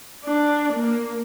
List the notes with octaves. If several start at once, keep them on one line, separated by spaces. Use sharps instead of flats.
D4
A#3